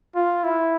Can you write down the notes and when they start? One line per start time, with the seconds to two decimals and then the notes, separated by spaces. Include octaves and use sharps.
0.15 F4
0.44 E4